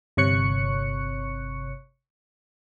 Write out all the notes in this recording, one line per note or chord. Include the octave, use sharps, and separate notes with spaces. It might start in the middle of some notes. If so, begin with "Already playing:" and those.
G1 C3 C#5 C#6 F#6 C#7